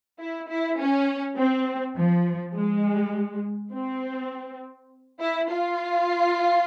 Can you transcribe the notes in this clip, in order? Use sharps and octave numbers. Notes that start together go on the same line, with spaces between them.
E4
E4
C#4
C4
F3
G#3
C4
E4
F4